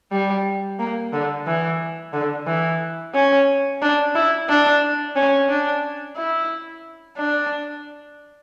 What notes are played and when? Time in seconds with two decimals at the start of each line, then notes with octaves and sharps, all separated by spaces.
0.12 G3
0.79 A#3
1.12 D3
1.47 E3
2.13 D3
2.47 E3
3.15 C#4
3.82 D4
4.15 E4
4.49 D4
5.15 C#4
5.49 D4
6.16 E4
7.18 D4